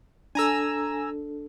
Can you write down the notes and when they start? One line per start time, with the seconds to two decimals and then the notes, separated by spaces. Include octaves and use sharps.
0.35 D4 A4 G#5 A#5 E6